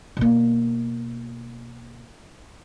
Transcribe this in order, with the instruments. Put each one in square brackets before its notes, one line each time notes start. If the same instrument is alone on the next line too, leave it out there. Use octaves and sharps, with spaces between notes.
[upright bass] B2 A#3